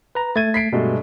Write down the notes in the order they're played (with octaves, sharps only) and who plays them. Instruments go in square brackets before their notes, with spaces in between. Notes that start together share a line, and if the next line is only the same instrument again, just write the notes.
[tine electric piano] B4 A#5
[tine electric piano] A3 G#6 [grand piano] A6 D#7
[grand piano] B6 C7 D7
[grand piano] G2 G#3 A3 [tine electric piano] B2